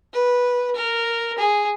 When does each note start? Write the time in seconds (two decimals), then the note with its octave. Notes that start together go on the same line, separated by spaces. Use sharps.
0.13 B4
0.76 A#4
1.38 G#4